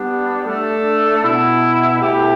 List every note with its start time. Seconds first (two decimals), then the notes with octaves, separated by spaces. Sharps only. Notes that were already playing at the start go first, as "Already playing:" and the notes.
Already playing: G3 B3 D4
0.44 A3 D4 A4
1.23 B2 B3 E4
2.01 B2 A3 E4 G4